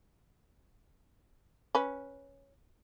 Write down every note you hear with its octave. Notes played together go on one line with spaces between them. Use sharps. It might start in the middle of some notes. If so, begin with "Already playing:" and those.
C#4 B4